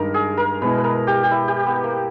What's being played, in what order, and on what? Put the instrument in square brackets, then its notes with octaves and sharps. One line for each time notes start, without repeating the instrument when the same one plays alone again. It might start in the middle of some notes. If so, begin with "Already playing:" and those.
Already playing: [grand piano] G2 D#3 G#3 D#4 [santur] A#4
[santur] G#4
A#4
[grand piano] B2 G#3 B3 E4 [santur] B4
[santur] B4
A#4
G4
G4
E4
G4
B3
A#3